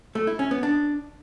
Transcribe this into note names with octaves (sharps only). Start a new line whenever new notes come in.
A3
E4
C#4
B3
D4